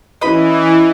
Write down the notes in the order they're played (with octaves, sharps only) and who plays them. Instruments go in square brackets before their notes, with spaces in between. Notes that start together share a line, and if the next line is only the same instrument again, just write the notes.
[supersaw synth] E3 [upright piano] C#4 E4 B4 [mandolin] D#5 B5